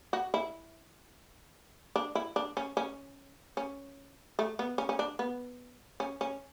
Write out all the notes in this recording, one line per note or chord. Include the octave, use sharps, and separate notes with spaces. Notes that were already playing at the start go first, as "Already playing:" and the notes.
F#4
E4
D4
E4
D4
C#4
C#4
C#4
A3
B3
C#4
C#4
D4
B3
C#4
C#4